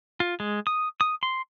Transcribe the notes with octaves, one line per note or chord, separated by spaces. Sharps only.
F4
G#3
D#6
D#6
C6